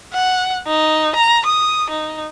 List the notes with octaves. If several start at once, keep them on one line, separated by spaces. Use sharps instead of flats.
F#5
D#4
A#5
D#6
D#4